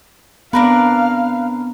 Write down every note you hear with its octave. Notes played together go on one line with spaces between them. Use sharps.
B3 C4 D4 A#4 B4 F5